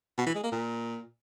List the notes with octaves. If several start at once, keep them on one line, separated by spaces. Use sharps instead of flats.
B2
E3
G#3
A#3
A#2